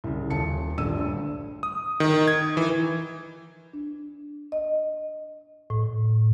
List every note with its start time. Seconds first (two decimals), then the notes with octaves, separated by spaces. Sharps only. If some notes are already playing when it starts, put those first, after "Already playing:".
0.04 C2 C#3
0.30 D#1 A5 C#7
0.78 D#1 A#1 G2 E6 D#7
0.96 D2 G2
1.63 D#6
2.00 D#3
2.28 G#6
2.57 E3
3.73 D4
4.52 D#5
5.70 A2